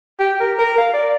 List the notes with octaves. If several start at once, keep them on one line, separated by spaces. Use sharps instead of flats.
G4
A#4
A#4
F5
D5